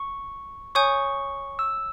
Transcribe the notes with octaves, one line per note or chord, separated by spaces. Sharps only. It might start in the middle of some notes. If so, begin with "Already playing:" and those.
Already playing: C#6
C#5 G#5 C#6 D#6 G6
E6